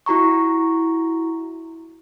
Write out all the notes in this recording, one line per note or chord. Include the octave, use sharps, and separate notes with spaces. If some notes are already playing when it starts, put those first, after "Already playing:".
E4 F#4 A#5 C#6